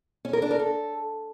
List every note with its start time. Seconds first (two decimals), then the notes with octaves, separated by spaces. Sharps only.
0.25 C#4
0.33 A#4
0.42 D4
0.51 A#4
0.59 A4